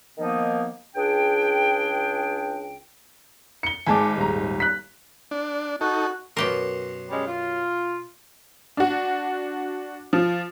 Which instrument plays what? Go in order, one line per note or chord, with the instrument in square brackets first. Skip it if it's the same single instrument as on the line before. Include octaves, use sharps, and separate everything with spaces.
[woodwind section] D#3 F3 A#3 B3 D#4
C#2 D4 G#4 G5
[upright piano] C#7 G7
[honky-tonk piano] G#1 G#3 [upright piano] G#5 A5 D6
[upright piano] D#1 A#5
F#6 B6
[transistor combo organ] D4
[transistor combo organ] D#4 A4 [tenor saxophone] F#4
[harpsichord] F#2 F#5 C6 [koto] B2 G4 A#4
[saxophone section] G3 G#3 C#4
F4
[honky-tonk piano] D4 F#4
F3